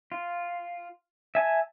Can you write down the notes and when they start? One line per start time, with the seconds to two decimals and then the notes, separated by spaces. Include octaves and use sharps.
0.12 F4
1.35 E5 G#5 A5